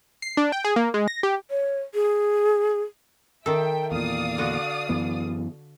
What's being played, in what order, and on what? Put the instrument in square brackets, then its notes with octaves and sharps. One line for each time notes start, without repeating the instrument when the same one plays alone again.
[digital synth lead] C7
D4
G5
G#4
A#3
G#3
A#6
G4
[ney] C#5
G#4
[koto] D#3 A4 [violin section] E5 G5
[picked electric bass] E2 A#2 [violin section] D5 F5 D#6
[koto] D3 F#4
[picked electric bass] F#2 E3 B3